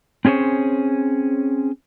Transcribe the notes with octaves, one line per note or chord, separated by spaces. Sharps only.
C4 C#4 G#4 C5 C#5